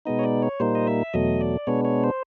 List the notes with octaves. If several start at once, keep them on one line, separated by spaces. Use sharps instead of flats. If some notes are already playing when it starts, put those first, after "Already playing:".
B2 G#3 B3 D#4 D#5
C#5
D5
C#5
A#2 G3 A#3 D#4 C5
D#5
E5
E2 B2 F#3 A3 D#5
D5
B2 G#3 B3 D4 C#5
C#5
C5